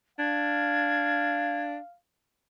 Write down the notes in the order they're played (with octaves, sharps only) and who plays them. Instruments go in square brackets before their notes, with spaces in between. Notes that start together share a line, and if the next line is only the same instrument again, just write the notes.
[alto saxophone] D4 [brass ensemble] F5 [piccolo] G#6